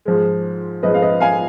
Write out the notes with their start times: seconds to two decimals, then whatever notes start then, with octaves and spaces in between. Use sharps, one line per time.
0.05 G#2 F3 G#3
0.83 G#2 F3 G#3 B4 D#5
0.94 F5
1.02 B4 D#5
1.20 F5 G#5